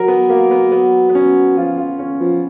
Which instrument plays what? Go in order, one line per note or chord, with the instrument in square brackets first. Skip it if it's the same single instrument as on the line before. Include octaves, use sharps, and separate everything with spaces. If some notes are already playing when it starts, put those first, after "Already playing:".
Already playing: [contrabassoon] F#3 [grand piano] A#4
[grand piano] B3
A#3
B3
B3
B3
C#4
[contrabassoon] F3 [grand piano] F4
[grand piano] F4
C#4
[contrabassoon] F3 [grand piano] B3